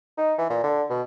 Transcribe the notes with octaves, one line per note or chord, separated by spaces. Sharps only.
D#4
E3
A#2
D3
B2